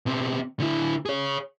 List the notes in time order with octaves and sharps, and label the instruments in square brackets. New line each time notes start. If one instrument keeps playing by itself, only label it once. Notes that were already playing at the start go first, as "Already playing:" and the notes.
[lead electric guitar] B2 C4
D3 E4
G#4 C#5